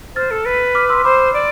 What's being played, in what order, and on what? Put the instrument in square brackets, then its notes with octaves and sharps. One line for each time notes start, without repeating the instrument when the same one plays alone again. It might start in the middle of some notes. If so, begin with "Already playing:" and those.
[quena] C5 [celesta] F6 A6
[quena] A4
B4
[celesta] D6 F6
C6 E6
[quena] C5 [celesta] B5 D6
[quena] D5